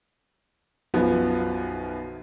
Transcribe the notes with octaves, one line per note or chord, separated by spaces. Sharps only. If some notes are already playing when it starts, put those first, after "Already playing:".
B1 F#2 B2 F3 B3